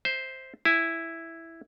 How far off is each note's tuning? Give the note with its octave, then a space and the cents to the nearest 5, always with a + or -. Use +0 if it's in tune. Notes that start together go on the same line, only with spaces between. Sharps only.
C5 +0 E5 -25
E4 +0 G#5 -10